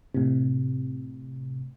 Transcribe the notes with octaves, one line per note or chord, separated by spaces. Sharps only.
A2 C3